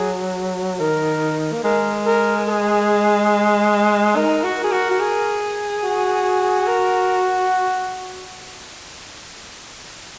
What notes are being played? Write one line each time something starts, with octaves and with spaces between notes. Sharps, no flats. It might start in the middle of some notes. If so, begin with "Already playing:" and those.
Already playing: F#3 G#4
D#3 A#4
A#3
G#3 A#4
A#4
G#4
D#4 A#4
F#4
A#4
G#4
F#4
F#4
G#4
F#4
A#4